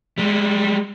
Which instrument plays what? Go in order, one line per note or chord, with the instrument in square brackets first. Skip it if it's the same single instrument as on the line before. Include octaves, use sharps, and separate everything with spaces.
[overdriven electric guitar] G3 G#3